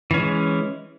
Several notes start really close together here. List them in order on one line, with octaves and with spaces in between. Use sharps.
E3 C#4 G#3